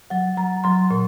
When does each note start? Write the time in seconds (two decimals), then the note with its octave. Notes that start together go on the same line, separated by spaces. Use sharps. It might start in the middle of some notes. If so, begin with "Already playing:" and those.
0.10 F#3 F#5
0.37 F#3 A#5
0.64 F#3 C6
0.91 A#2